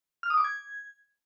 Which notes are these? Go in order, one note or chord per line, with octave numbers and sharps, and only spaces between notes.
F6
D#6
D6
G#6